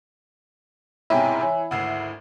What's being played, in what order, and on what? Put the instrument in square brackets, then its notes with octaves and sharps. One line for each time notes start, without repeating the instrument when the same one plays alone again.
[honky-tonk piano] B1 G#2 C3 [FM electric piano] E4 [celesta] C#5 G5 G#5
[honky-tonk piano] E3 [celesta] C#5 G#5 E6
[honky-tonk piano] G#1 D2 [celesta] F#5 E6 C7